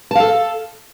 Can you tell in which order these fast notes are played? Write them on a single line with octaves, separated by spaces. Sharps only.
A5 F5 A4